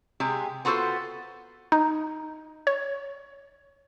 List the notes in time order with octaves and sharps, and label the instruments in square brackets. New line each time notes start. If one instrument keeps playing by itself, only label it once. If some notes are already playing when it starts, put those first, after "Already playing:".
[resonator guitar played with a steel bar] C3 G#3 G4 G#4
B3 F4 F#4 A4 C5
[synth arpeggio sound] D#4
C#5